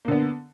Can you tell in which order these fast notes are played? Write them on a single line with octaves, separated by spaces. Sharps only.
A#3 D3 B3